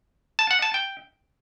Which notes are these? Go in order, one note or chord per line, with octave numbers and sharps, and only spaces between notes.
A5
F#5
A5
G5